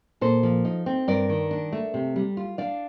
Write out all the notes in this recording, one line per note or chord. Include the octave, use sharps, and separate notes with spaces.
A#2 A4 C5
F3
D#4
C4
G2 A#4 D5
D#3
D4
A3
C3
G3
F4
D4 D5 F5